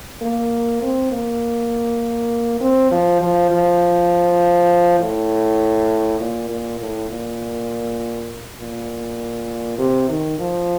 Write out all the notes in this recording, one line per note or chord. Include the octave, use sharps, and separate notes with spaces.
A#3
C4
A#3
C4
F3
F3
F3
A2
A#2
A#2
A2
A#2
A#2
C3
D#3
F3